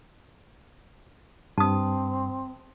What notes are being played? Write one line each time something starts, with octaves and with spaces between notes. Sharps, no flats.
G2 C4 A5 D#6